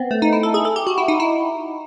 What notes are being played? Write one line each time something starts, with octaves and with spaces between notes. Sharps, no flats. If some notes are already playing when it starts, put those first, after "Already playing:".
Already playing: B3 C4
A3
D#4
E4
A4
G#4
A4
G4
F#4
E4
D#4
E4